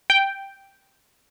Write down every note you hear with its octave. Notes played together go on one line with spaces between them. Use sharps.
G5